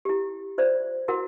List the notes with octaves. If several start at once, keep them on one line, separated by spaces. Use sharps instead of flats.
E4 G4
F4 C5 D5 E5
E4 F#4 A#4 F#5